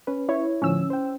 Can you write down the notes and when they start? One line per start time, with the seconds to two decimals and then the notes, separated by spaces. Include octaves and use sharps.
0.07 C#4 B4
0.29 E4 C#5
0.62 A2 D3 F3 C#4 E6
0.90 C5 G5